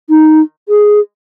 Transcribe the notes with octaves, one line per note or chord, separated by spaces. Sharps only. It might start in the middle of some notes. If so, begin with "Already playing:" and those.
D#4
G#4